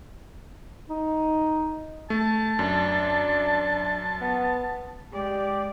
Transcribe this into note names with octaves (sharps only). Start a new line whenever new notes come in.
D#4
A3 A5
F#2 D4
B3
G#3 G4 D5